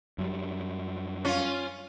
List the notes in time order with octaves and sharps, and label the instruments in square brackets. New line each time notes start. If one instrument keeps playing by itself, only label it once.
[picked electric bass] F#2 F#3 G3
[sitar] C#4 F4